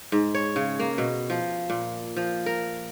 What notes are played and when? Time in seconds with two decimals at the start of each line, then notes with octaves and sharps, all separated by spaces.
0.12 G#2
0.35 C#5
0.56 C#3
0.80 A#3
0.98 B2
1.30 F3
1.70 A#2
2.16 F3
2.46 A#4